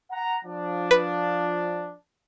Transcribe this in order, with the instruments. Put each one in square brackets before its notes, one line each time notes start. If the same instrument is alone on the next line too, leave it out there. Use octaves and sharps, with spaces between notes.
[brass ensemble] F#5 A#5
F3 D4
[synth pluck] B4